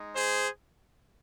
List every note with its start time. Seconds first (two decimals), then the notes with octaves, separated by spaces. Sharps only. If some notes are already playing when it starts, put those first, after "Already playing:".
Already playing: G#3 D#4
0.16 G#4 C5